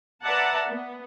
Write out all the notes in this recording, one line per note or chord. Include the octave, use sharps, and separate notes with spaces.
B4 D5 E5 F#5 A5 A#5
B3